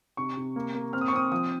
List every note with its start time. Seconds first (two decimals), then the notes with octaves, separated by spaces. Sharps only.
0.17 C3 C#6
0.37 C3
0.56 A#3
0.75 A#3
0.93 C4 F6
1.01 D#6
1.08 C#6
1.13 C4 D#6
1.32 F3 D#6